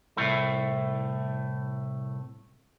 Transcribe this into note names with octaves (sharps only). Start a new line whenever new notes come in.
C2 A2 A3